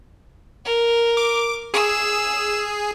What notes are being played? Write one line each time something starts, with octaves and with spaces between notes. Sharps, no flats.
A#4
D6
G#4 E6